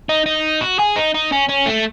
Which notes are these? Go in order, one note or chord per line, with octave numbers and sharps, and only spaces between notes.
D#4
D#4
F#4
G#4
D#4
D#4
C#4
C#4
A3